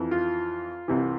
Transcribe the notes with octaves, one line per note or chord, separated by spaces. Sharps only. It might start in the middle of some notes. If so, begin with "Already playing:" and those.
Already playing: F2 E3
F4
C2 C3 E3